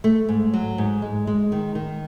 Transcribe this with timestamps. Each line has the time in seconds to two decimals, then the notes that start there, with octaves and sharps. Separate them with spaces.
0.04 A3
0.29 G#2
0.54 F#3
0.78 G#2
1.02 G#3
1.27 G#3
1.52 D#3
1.75 D#3